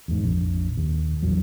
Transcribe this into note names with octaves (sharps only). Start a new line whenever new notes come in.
E2 G#2
A#1 F2
D#2
A#1 E2 F#3